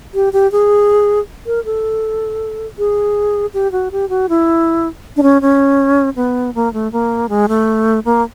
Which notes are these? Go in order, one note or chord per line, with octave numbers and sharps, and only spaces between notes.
G4
G4
G#4
A#4
A4
G#4
G4
F#4
G4
F#4
E4
D4
C#4
C#4
B3
A#3
A3
A#3
G#3
A3
A#3